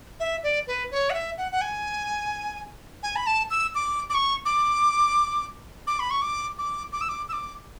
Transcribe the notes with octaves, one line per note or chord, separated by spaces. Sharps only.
E5
D5
B4
C#5
F#5
E5
F#5
F#5
G#5
G#5
B5
A5
E6
D6
D6
C#6
D6
D6
B5
C#6
D6
D6
D6
E6
D6
E6
D6